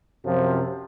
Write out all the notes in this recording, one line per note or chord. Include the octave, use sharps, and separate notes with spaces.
F#2 C3 F3